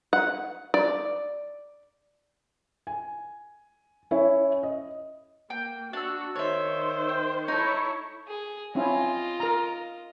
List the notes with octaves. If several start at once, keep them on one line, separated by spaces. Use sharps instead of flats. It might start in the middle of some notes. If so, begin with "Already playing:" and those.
F#5
D5
G#5
C#4 E4 C#5
D#5
A#3 G5
D4 F#4 E6
D#3 C5 C#5 E5
G5
D#4 E4 A4 C#5
G#4
C4 C#4 E4 F4 D#5
A#4 A#5